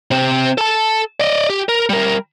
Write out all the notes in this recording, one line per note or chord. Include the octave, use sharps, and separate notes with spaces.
C3 C4
A4 A5
D5 D#5
G4
A#4
G3 A#4